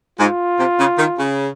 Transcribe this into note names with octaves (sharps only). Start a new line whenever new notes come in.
G#2 F4
C3
C#3
D#3
C#3